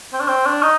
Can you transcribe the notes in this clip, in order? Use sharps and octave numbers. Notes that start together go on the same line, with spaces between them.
C4
D4
C4
D4
D#4